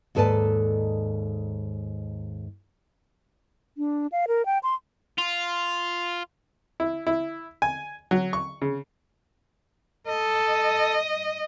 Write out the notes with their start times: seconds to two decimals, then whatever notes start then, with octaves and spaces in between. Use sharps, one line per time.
0.15 D#2 G#2 A4 B4 D5 A5
3.78 D4
4.12 F5
4.28 A#4
4.46 G5
4.63 C6
5.18 F4
6.80 E4
7.07 E4
7.62 G#5
8.11 F#3
8.33 C#6
8.62 C#3
10.07 A4 D#5